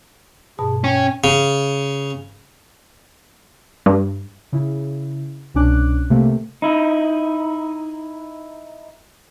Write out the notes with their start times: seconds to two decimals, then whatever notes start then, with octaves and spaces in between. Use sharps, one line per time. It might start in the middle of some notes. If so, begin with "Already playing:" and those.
0.59 G2 B2 G#4 A5
0.84 C#4 G5
1.24 C#3
3.86 G2
4.52 C#3 E4
5.54 C2 B2 C#4 D4 D6 F#6
6.10 C3 A3 A#3
6.62 D#4 E4